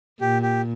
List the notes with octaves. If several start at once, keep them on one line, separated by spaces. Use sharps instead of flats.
A#2 G4
G4